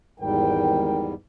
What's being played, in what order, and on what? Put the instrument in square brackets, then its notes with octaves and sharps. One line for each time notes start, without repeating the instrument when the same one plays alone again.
[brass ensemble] G#1 A#4 G5 [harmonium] E2 G#2 G3